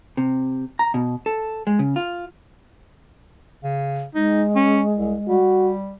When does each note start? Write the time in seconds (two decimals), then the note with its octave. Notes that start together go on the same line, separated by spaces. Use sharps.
0.17 C3
0.79 A#5
0.94 B2
1.26 A4
1.67 G#3
1.79 C#3
1.96 F4
3.64 C#3
4.15 G#3 D#4
4.55 C#4
4.95 C2
5.29 G3 F#4